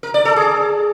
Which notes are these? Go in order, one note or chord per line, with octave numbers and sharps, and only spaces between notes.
A#4
D5
A4
G#4